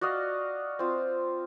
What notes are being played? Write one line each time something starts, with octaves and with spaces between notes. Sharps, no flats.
F#4 D5 D#5 F5
C4 F4